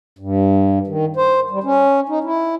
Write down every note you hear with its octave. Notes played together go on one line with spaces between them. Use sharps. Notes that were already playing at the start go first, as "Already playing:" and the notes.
G2
D#3
C5
G3
C#4
D#4
E4